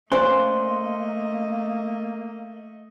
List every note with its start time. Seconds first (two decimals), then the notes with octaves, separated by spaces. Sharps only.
0.12 A3 A#3 C#4 C5 D5 D#5 C6 F#6